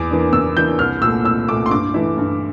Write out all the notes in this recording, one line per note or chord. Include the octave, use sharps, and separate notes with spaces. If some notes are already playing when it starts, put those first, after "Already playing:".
Already playing: E2 D6
E3 A#3 D4
E2 E6
E3 A#3 D4 G6
C2 F6
A#2 A3 E6
C2 E6
A#2 A3 D6
C6
G2 D6
E3 A3 E4
G2